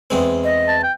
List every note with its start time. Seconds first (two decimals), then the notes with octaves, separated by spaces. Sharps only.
0.10 E2 G#3 C4
0.44 D#5
0.68 A5
0.83 G5